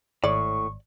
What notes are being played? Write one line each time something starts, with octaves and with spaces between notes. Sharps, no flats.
G#1 A2 C#5 D5 C#6